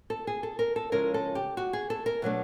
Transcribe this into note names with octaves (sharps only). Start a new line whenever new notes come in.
A4
G#4
A4
A#4
A4
C#3 F3 G#3 C#4 E4 A#4
A4
G4
F#4
G#4
A4
A#4
B2 F#3 A3 D4